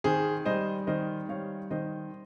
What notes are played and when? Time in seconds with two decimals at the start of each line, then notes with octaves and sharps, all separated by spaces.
0.04 D#3 G#4 C5
0.45 G3 C5 D#5
0.87 D#3 C5 D#5
1.29 G3 C#5 F5
1.71 D#3 C5 D#5